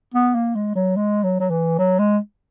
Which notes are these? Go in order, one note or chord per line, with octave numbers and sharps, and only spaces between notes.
B3
A#3
G#3
F#3
G#3
F#3
F#3
E3
F#3
G#3